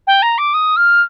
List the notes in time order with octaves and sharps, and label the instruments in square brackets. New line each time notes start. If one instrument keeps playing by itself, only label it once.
[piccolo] G5
A#5
D6
D#6
F6